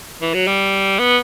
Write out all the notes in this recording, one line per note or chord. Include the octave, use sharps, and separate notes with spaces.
E3
F#3
G3
B3